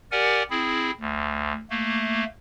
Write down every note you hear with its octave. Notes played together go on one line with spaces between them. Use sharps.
G4 A#4 D5 F#5 G#5
C4 E4 G#4
D2
A3 A#3